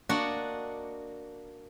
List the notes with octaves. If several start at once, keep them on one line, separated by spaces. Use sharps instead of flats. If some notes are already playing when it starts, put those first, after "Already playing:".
A#3 D4 F#4 D#5 F#5